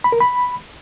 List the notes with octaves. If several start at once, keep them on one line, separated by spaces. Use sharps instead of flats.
B5
A#4
B5